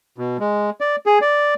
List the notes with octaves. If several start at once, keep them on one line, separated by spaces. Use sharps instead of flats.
B2
G#3
D5
G#4
D5